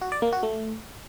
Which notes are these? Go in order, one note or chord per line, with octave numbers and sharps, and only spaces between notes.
F#4
D5
A#3
F#4
A3